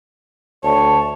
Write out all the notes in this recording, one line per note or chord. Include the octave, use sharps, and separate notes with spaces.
D2 C#5 A5